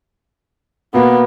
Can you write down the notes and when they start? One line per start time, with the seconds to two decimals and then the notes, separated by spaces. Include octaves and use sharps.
0.94 B2 A#3 B3